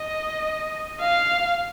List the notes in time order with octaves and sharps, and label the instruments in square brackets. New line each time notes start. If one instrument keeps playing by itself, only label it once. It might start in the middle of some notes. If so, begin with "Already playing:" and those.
Already playing: [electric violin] D#5
F5